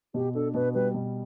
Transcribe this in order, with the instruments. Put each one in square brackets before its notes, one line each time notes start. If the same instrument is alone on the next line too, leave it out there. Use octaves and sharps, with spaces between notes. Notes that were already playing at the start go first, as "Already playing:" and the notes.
[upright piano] B2 [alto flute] G4
[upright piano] D4 [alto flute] A4
[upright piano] B2 [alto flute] B4
[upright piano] G3 [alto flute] B4
[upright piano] B2